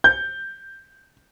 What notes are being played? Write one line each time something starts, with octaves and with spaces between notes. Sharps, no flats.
G6